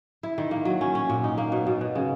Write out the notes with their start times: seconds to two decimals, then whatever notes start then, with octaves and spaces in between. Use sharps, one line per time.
0.23 E4
0.38 D#3
0.51 A#3
0.65 F#3
0.81 C#4
0.95 C#4
1.10 A#2
1.24 D#4
1.38 A#3
1.52 B2
1.67 B2
1.81 B2
1.95 C#3